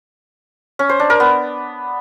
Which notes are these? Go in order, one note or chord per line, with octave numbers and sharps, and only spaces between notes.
C#4
C5
D4
A#4
B3